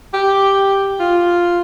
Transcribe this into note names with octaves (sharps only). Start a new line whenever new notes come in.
G4
F4